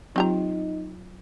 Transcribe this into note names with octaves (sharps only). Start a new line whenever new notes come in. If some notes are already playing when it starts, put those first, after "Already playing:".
F#3 C4 D#4 F4 G4 A#5